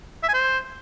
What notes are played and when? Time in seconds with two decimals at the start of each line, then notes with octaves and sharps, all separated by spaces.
0.23 E5
0.28 G#5
0.34 C5